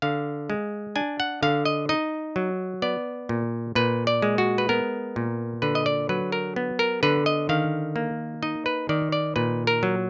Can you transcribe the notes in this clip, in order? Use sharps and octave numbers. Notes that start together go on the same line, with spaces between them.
D3 F5
G#3
D4 G#5
F#5
D3 F5
D#5
D#4 D#5
F#3
B3 D5
A#2
A#2 B4
D5
G#3
F#4
B4
B3 A#4
A#2
D3 B4
D#5
D5
F#3 B4
A#4
B3
A#4
D3 B4
D#5
D#3 F5
A#3
D#4 D#5
B4
D#3 D5
D5
A#2 B4
A#4
F#3